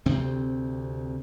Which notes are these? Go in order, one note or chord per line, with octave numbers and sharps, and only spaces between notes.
D2 C3 C4